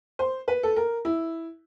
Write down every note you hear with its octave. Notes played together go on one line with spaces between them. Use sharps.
C5
B4
A4
A#4
E4